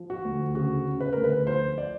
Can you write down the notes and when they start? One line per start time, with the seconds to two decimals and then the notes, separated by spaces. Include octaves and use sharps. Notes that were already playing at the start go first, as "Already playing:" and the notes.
Already playing: F3
0.10 F#4
0.25 D2
0.55 C#3 F#4
0.86 C#3
1.00 B4
1.13 D2 A#4
1.24 B4
1.47 F3 C5
1.78 D5